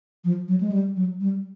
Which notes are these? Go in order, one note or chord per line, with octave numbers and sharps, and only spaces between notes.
F3
F#3
G#3
G3
F#3
G3